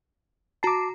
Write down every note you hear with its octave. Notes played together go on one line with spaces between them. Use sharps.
F#4 A5 A#5 D6 C7